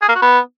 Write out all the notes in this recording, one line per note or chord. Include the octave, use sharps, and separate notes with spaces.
G#4
A#3
F#4
B3